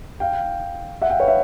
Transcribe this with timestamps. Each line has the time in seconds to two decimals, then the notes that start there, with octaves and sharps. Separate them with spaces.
0.20 F5 G5
1.02 E5 F#5
1.10 F5 G5
1.20 B4 C#5
1.28 E5 F#5